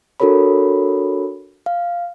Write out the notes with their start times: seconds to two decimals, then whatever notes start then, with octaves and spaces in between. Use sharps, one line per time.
0.20 D4 F#4 A4 A#4 C#5 B5
1.66 F5